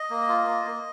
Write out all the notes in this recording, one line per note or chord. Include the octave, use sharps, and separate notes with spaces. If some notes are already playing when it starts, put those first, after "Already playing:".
Already playing: D#5
A#3
F4
A#3
A#3